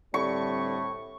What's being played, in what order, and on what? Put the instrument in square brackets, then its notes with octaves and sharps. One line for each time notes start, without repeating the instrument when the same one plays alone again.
[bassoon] A2 [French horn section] D3 G3 C4 [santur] C#6